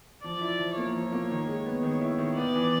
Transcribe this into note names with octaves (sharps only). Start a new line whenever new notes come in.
F3 D5
E4
F3
A#3 C#5
F3
A#3
D#3
G#3
B3
D#3 C#5
E4
D#3
B3 D5
E3